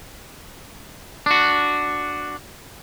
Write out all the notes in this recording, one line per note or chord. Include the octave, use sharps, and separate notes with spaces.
D4 F#4